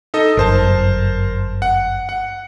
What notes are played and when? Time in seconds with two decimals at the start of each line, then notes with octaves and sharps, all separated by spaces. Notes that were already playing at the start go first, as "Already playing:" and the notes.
0.14 D#4 A4 D#5
0.37 G1 F#2 A#4 C5 A5
1.62 F#5
2.09 F#5